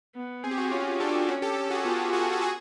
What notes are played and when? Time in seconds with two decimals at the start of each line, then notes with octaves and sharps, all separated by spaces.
0.16 B3
0.43 C4 G#4
0.51 G4
0.58 F#4 G#4
0.71 C#4 F4 G4
1.00 D4 G4 A4
1.28 C#4 F#4 G#4
1.42 G4 A4
1.57 G4 A4
1.70 F#4 G#4
1.85 B3 F4 G4
2.13 F#4 G#4
2.32 A4
2.41 F#4 G#4